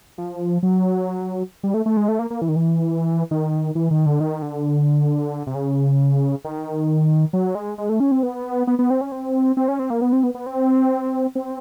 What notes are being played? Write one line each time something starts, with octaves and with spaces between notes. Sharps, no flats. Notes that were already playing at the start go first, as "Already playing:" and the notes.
F3
F#3
G3
A3
A3
G#3
A3
A#3
A#3
E3
D#3
E3
D#3
E3
D#3
D3
D#3
D3
C3
C#3
D#3
F#3
G#3
G#3
A3
C#4
C4
B3
B3
B3
C4
C#4
C4
C4
C#4
C4
A#3
B3
C4
B3
B3
C4
C4